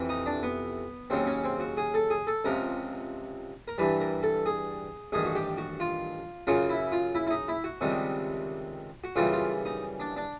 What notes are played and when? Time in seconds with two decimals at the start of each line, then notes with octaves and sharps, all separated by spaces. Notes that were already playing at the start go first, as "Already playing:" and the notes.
Already playing: F2 C3 E3
0.09 D#4
0.26 D4
0.43 B3
1.10 D#2 C#3 F#3 C4
1.27 C#4
1.44 C4
1.60 F#4
1.77 G#4
1.94 A4
2.10 G#4
2.27 A4
2.45 C#2 C3 F3 A#4
3.68 A#4
3.78 G2 E3 G3 B4
4.00 A#4
4.23 A4
4.46 G#4
5.12 A1 G2 D#3 G#4
5.25 F#4
5.36 G4
5.57 F#4
5.80 F4
6.47 F#2 C#3 F#3 F4
6.70 E4
6.92 F4
7.15 E4
7.27 E4
7.30 D#4
7.48 E4
7.64 F#4
7.81 C#2 C3 D#3 G3
9.04 F#4
9.16 F#2 C#3 E3 G3 F4
9.32 F4
9.65 D#4
10.00 D4
10.17 D4